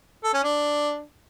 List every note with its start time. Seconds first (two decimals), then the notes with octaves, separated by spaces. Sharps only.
0.24 A4
0.34 C#4
0.44 D4